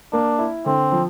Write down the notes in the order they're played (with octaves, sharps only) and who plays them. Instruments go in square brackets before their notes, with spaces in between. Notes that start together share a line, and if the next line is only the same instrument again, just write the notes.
[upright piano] A#3 [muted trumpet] D4
[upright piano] E4
[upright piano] D3 [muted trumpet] C4
[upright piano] F3